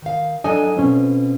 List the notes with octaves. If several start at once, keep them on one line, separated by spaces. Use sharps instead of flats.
D#3 F5
F#3 D4 A4 D#5 G#5
B2 C4 C#4 F4